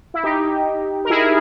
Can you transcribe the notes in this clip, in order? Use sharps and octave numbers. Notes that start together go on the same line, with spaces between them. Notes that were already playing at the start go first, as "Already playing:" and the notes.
E4
D#4 G4
A#4
E4 G#4